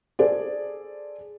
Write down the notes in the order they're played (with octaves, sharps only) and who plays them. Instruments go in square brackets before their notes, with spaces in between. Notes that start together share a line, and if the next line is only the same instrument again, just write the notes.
[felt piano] G#4 A4 C5 D5